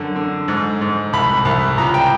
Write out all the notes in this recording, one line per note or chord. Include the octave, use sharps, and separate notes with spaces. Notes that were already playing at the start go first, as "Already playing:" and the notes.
Already playing: F#2 D3
D3
G#2
G#2
C2 B5
C2
C#2 A#5
G5